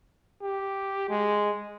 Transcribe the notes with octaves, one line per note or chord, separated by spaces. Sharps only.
G4
G#3